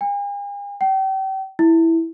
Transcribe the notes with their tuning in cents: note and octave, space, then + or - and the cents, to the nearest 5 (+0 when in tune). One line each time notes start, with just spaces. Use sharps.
G#5 -45
G5 -35
E4 -5